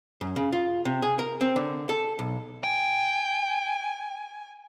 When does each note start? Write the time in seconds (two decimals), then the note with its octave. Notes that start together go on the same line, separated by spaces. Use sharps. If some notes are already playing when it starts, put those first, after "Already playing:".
0.21 F#2
0.36 C#3
0.52 F4
0.85 C3
1.02 G#4
1.19 A#4
1.41 C4
1.56 D3
1.89 A4
2.19 B1
2.64 G5 G#5